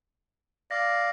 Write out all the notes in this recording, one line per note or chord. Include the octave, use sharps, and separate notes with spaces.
D5 F5 A#6